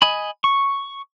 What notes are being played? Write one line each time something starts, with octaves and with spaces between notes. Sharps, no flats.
D#5 G#5 B5
C#6